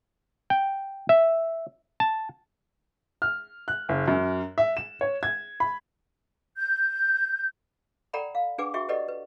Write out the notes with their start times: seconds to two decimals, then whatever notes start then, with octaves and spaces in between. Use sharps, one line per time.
0.50 G5
1.09 E5
2.00 A5
3.22 F6
3.68 F#6
3.89 F#1
4.08 F#2
4.58 E5
4.77 E7
5.01 C#5
5.23 G#6
5.60 B5
6.57 G6
8.13 A4 D5 F#5 G5 A#5 B5
8.35 F5
8.58 D4 G#4 B4 F#5 G#5 D6
8.74 F4 F#4 G#4 E5 G5 C#6
8.89 G4 A4 B4 D5 D#5 F#5
9.08 B4